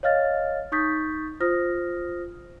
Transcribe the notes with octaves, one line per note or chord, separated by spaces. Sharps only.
C#5 D#5 F5 F6 A6
D#4 C#6 D#6 G6 A6 B6
F4 C5 D#6 F6 A#6